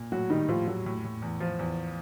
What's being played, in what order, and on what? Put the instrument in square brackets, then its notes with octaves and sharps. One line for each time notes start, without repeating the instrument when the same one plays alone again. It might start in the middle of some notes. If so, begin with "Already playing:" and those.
Already playing: [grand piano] A#2
[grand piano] A2 [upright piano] F#3 F#4
[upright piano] D#3 D#4 [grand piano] G3
[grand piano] A2 [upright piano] F3 F4
[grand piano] A2 [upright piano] F#3 F#4
[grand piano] A2
A2
E2
F3
E2